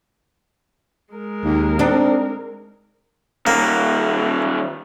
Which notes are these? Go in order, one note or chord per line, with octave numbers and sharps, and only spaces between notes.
G#3 A#4
D#2
C4 D4 D#4
D#3 G3 A#3